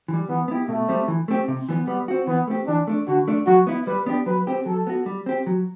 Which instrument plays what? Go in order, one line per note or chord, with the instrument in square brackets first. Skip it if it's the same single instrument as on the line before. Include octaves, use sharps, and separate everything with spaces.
[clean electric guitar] E3
G3
[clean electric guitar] E3 [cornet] B3
[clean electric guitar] B3 E4 G4
[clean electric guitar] B2 [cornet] A3
[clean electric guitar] G3 C4
E3
A3 C4 G4
C3
E3 B3
[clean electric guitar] G3 [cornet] B3
[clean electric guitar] C4 F#4
[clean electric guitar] E3 [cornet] B3
[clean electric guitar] A3 C4 G4
[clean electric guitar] E3 [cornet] D4
[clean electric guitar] A3 D4
[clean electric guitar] D3 [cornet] F#4
[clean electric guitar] A3 D4
[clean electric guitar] F#3 [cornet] F#4
[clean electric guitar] B3 E4
[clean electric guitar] G3 [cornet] B4
[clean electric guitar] B3 D4 G4
[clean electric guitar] F#3 [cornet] B4
[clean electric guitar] C4 G4
[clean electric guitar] F#3 [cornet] A4
[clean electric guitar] B3 F#4
G3
C4 G4
F#3